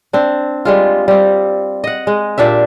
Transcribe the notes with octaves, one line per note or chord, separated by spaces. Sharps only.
C4 D4
G3 G#3 F4
G3 C4
D#5 F#5
G#3
A#2 D4 G4 E5